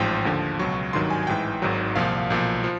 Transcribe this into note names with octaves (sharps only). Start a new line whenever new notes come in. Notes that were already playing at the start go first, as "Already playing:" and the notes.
Already playing: A1 G#2 F3 G5
D#2 D3 F3
C#2 B2 F#3 C#6
G#1 G2 D#3 F#3 C6
G#5
G#5
A1 G#2 E3 G5
G#1 G#2 D#3 F#3
C2 A#2 F3 F5
B1 A#2 F3
F3